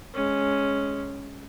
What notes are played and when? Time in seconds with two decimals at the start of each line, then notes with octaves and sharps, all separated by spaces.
0.14 G#3 C#4